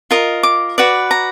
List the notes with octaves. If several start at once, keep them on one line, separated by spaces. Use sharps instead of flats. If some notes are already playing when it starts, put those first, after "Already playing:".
F4 A#4 D#5
D6
F#4 B4 D5
A#5